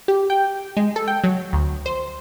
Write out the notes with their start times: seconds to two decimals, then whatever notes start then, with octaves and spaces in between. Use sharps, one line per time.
0.08 G4
0.30 G5
0.77 G#3
0.96 A4
1.08 G5
1.24 F#3
1.53 D2
1.86 C5